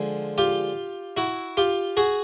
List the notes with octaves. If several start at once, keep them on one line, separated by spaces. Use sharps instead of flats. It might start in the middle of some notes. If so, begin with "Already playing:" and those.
Already playing: D3 F3 G#3
F4 G4
E4 F#4
F4 G4
F#4 G#4